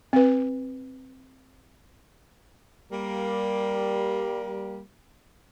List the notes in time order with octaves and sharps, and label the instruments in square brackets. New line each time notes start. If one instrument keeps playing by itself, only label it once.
[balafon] C4 B4
[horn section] G3 A#3